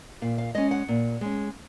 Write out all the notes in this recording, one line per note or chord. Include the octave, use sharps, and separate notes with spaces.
A#2 F5
F5
G#3 C#4 D#5
F#5
A#2
G#3 C#4